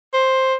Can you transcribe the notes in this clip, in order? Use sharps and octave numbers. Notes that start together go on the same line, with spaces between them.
C5